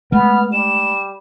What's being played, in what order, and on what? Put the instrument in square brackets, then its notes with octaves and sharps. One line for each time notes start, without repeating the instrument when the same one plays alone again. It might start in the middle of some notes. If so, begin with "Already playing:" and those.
[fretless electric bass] G#3 A3 [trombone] B3 [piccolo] F6
[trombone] G3 [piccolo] E7